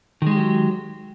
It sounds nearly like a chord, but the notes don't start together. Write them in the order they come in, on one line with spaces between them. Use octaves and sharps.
D#3 G#3 G4 F#3